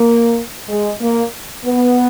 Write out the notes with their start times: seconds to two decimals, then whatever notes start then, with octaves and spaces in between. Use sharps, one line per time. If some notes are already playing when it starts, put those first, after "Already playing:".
Already playing: A#3
0.69 G#3
1.01 A#3
1.66 B3